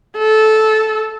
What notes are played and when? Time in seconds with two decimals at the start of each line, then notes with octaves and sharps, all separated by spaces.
0.19 A4